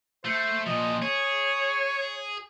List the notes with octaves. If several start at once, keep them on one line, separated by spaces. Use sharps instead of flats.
A3 C5
A#2 F3 D#5
G#4 C#5